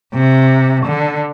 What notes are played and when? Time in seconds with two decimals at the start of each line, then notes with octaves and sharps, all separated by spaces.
0.14 C3
0.85 D3